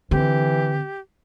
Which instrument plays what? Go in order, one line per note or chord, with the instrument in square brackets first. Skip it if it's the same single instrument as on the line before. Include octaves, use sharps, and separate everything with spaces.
[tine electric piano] D3 [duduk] E3 [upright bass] C4 [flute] G4